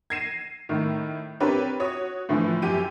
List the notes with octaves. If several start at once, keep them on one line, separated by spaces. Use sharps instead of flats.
G#6 A#6 C7 D#7 E7
A2 D#3
C4 D4 G4 A#4 B4 C#5
F#4 C#5 D#6
A2 D3 E3 F3
F#2 G4 D#7